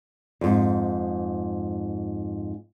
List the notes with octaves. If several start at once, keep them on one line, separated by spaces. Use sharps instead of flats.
F2 G#2